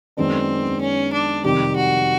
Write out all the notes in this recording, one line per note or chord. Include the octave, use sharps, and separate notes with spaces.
F#2 D#3 G#3 B3 C4 D4
C#4
D4
F2 C3 D#3 G3 G4
F#4